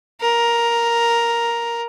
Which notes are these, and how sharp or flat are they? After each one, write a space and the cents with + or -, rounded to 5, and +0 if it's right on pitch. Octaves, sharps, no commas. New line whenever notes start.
A#4 +5